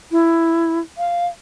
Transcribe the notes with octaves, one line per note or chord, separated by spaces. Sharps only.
E4
F5